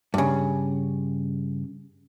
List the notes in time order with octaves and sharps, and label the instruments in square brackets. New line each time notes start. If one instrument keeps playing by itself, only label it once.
[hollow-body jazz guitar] G2 C#3